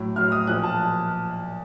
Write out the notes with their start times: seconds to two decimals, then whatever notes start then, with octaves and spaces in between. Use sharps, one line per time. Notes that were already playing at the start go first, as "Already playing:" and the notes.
Already playing: A2 F#3
0.16 A2 F#3 F6
0.32 D#6
0.47 A#2 F3 F#6
0.63 A5